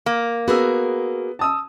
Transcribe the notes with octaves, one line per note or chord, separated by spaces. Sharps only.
A#3
B3 F#4 G#4 A#4 E6
A5 D#6 E6